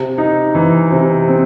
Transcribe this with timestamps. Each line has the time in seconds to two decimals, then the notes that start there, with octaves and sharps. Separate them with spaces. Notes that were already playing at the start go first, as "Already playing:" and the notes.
Already playing: C3
0.18 D#4
0.55 E3
0.91 C3
1.28 C4